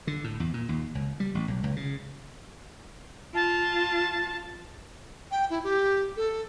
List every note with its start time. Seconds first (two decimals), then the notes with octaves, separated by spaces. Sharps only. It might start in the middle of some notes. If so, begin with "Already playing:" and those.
0.07 D3
0.24 A2
0.40 E2
0.54 A#2
0.69 D#2
0.95 C#2
1.20 G3
1.35 A1
1.48 B1
1.64 C#2
1.76 C#3
3.35 F4 A5
5.31 G5
5.50 E4
5.64 G4
6.17 A4